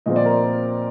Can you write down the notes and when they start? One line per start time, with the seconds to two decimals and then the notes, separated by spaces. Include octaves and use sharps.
0.06 A#2 F3 C4 D#5
0.16 D5
0.25 A#4